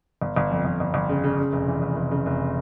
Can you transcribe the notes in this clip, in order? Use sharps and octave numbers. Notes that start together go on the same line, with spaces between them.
G1
G1
F2
G1
G1
G1
C#3
C#3
C#3
F1
E3
F1
F1
C#3
F1